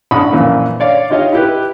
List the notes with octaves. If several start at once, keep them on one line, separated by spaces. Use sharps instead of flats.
A1 D4 F#5 B5 C#6 D#6
F#2 A#2 E3 F3
C#5 D5 F5
D#4 F4 G4 C#5 D#5 F5
E4 G4 B4